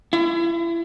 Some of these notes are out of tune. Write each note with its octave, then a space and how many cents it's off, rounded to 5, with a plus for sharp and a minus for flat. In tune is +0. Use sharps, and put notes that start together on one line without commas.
E4 +35